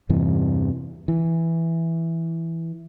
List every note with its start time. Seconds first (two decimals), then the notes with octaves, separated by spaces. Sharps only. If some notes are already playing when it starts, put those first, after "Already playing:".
0.09 E2 G2 C3 E3
1.08 E3